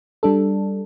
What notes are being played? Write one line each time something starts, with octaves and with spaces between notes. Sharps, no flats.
G3 D4 A4